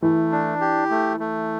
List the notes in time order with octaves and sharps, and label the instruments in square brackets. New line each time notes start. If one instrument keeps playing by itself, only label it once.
[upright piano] E3 [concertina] A3
[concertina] D4
G4
A3
A3